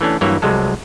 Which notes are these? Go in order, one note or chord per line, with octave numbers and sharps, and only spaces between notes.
E3 A3 C#4 D4
G2 E3 F#3 A#3 E4 C#5
C2 C3 F#3 G#3 A4